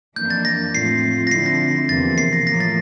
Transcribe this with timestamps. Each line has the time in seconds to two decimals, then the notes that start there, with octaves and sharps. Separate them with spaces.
0.16 F2 E3 A#3 D4 G6
0.30 A6
0.45 A#6
0.74 A2 F3 A3 C4 F4 C7
1.27 A#6
1.31 D3 F3 C4 E4 C7
1.46 A#6
1.89 E2 C3 F3 A#3 A6
2.18 C7
2.33 A#6
2.46 A2 F3 A#3 A#6
2.60 A6